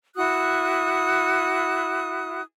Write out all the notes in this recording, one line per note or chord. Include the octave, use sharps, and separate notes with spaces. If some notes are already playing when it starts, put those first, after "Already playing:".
E4 F#4 D#6 F#6